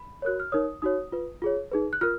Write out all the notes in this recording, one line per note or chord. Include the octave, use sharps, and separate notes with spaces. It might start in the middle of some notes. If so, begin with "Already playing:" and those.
Already playing: B5
F#4 A#4 C#5 F#6
F6
D#4 A#4 C#5 D#6
D#4 F#4 C#5 D#6
F4 B4
F4 G#4 C#5
D#4 G#4 B4
F#6
F4 A#4 F6